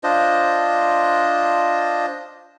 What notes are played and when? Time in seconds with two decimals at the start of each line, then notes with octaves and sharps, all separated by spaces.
0.04 D4 F4 C5 D#5